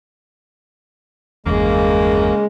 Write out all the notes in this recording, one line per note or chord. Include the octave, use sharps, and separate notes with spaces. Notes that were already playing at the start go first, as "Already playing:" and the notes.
G1 E2 C#3 G#3 A#3